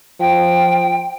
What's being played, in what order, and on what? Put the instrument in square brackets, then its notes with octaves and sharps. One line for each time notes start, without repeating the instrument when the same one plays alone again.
[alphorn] F3 [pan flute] G5